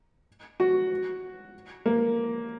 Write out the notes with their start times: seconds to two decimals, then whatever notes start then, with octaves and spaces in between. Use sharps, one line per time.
0.60 F#4
1.86 A#3